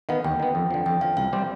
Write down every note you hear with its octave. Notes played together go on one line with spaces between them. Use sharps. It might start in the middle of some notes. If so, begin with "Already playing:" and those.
D#3 B3 F5
D#2 G5
D#3 B3
F2
D3 F3
F2 G5
D3 F3 F5
C2 F5
C3 G3 C4 G4